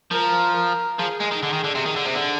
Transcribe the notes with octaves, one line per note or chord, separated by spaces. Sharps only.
F3 A#4
A#4
F3 G#4
G#3
D#3
D3
D#3
D3
C3
D#3
D3
C3
D3